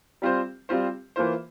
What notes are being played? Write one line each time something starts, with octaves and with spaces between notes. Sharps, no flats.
G3 C4 F4 C5
G3 C4 F4 C5
E3 A#3 F4 C5